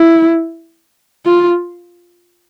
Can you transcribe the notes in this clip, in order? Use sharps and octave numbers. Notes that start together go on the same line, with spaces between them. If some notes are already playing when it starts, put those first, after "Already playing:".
Already playing: E4
F4